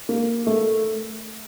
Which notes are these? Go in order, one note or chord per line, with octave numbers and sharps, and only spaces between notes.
A#3
A3